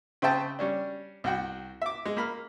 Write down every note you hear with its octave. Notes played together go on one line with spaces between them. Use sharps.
C#3 C4 C5 E5 G5 A5
G3 C#4 D4
C2 F#4 G5
E5 D6
G#3
A#3 B5 F6